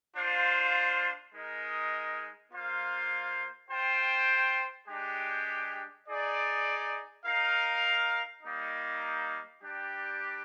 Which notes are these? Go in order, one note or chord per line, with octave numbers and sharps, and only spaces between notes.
D4 F4 C5 F5
G#3 D#4 A#4 D#5
A#3 F4 C5 F5
F4 C5 G5
G#3 D4 G4
D#4 G#4 D5
D#4 A#4 F5
G3 A#3 D#4
G3 D4 G4